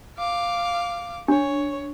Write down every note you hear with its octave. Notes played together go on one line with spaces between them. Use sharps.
F5 D6
D4 C#5